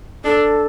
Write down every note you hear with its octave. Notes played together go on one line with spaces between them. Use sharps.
D4 A4